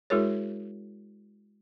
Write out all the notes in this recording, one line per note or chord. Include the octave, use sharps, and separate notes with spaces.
G#3 E4 F#4 G#4 A#4 C#5